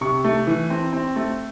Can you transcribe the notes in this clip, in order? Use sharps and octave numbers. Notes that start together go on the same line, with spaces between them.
C3 C#6
A3
E3
C4
C4
A3